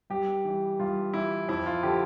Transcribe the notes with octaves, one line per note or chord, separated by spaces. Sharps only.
G2 G4
E3 G3
G2 F4
E3 G3 E4
F2 E4
F4
D3 F3 G4